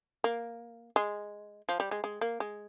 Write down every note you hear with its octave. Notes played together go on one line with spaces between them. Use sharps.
A#3
G#3
F3
G3
G#3
G#3
A#3
G#3